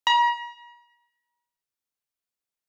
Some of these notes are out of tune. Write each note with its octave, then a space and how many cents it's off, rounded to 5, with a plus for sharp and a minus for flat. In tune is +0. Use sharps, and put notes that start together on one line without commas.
A#5 +40